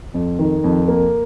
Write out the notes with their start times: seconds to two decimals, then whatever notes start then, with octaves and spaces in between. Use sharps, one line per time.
0.14 F2
0.39 D#3
0.64 F2
0.88 A#3